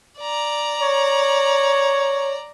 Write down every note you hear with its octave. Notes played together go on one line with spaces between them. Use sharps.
D5 A#5
C#5